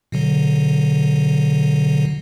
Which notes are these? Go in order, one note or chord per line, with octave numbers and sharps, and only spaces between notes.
B2 D3 F#3